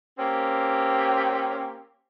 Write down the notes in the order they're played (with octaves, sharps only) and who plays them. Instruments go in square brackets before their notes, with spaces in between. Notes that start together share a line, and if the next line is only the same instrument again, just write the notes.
[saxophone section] A#3 C4 C#4 G4